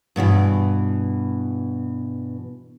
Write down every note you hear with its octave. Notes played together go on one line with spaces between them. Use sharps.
G2 B2 D3 E3